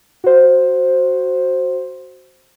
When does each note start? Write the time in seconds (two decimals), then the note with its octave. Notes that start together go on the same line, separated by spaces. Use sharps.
0.24 F#4 C5